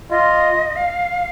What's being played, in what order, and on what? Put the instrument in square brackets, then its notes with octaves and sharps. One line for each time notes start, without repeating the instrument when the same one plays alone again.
[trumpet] F4 [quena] D#5
[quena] F5